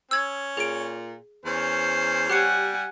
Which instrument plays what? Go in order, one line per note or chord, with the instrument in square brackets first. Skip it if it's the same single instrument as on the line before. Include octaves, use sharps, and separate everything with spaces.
[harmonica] C#4 [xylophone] E6 G#6
[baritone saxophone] A#2 [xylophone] G#4 D7
[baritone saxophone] E2 [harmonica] C#4 C5
[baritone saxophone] G3 [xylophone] G4 C7 C#7 [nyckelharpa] F#5 G#5